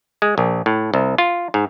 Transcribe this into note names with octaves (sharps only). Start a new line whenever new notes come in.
G#3
A#1
A2
C2
F4
G#2